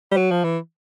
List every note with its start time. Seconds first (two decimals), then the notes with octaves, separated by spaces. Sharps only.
0.12 G3
0.17 F#3
0.31 F3
0.44 E3